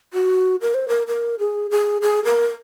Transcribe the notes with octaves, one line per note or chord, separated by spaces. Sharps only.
F#4
A#4
C5
A#4
A#4
G#4
G#4
G#4
A#4